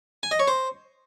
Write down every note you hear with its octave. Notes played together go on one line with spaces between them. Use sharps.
G#5
D#5
C#5
C5